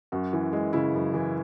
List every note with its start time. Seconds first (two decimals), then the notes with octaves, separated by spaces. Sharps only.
0.12 F#2 F#4
0.33 E3
0.53 G#3
0.73 C#3 E4
0.95 F#2
1.14 E3